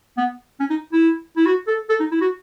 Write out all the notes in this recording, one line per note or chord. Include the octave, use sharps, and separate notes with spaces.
B3
C#4
D#4
E4
E4
F#4
A4
A4
D#4
E4
F#4